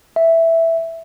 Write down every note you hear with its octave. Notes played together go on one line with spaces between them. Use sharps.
E5